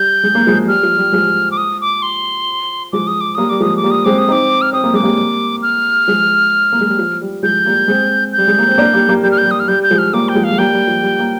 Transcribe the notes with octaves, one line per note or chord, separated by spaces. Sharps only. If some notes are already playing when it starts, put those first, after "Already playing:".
Already playing: G3 G6
G#3
A#3
F3 G#3
G3 F6
F3
G3
F3 G#3
D6
D#6
D6
C6
F3 G#3 D6
D#6
D6
G3 A#3 D#6
G3 D6
F3 G#3 D#6
D6
G3 A#3
D#6
G#3 C4 D6
D#6
C4 D#4 D6
F6
C4 D#6
A#3
G#3 D6
G3 A#3
F6
F3 G#3
A#3
G#3
G3
F3
G3
F3 G#3 G6
G3 A#3
G#3 C4
G6
G3
G#3
A#3
C4
A#3 D4
G3 A#3
G3 A#3
G3 G6
F6
G6
G3
D#6
F6
G3 G6
G6
F3 G#3
F6
G3 A#3 D6
G5
F3 G#3
F5
G#3
G3 A#3 G5
G3
F3
G3
A#3